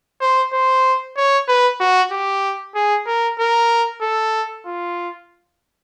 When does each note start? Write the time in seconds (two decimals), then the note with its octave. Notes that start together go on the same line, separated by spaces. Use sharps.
0.21 C5
0.53 C5
1.17 C#5
1.48 B4
1.80 F#4
2.12 G4
2.75 G#4
3.07 A#4
3.40 A#4
4.02 A4
4.66 F4